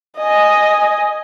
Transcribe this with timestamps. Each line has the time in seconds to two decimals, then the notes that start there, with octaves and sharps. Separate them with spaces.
0.18 D#5 G#5